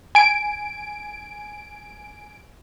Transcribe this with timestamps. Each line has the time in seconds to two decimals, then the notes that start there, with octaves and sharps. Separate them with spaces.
0.15 G#5 D7